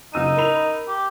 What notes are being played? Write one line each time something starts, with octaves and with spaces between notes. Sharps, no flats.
F#1 D#4 E6 D#7
A#4 B5 F7
G4